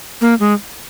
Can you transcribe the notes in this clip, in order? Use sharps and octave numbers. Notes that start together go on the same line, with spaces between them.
A#3
G#3